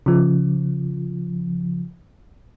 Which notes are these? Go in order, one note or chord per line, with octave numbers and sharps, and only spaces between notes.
C#3 F3